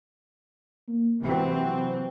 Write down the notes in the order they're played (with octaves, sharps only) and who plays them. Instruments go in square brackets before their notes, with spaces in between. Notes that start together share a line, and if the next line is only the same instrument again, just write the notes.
[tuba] A#3
[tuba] C3 [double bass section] E3 F#3 C4